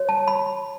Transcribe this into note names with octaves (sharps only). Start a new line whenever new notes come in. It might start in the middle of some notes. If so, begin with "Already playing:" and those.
Already playing: F#4 C#5
A5
B5